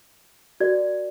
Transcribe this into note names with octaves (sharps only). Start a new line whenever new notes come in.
F#4 A#4 D5 G#6